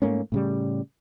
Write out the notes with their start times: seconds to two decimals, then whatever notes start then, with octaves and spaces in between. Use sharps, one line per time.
0.02 G#2 A3 A#3 C#4
0.32 A2 C#3 G3